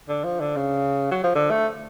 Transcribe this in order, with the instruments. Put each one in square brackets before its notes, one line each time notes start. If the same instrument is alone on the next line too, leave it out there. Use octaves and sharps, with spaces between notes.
[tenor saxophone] D3
F3
D3
C#3
F#3
F3
D3
A3